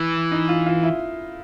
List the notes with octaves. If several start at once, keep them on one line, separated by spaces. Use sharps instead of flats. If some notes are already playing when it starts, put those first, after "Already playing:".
Already playing: E3
D#4
F4
F4
E4